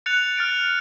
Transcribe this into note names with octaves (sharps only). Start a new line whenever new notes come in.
F#6 A6 C#7 F7
F6 A6 D7